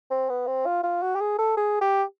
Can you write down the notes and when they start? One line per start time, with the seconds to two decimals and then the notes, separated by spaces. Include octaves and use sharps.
0.11 C4
0.29 B3
0.47 C4
0.66 F4
0.84 F4
1.02 F#4
1.16 G4
1.21 G#4
1.39 A4
1.57 G#4
1.81 G4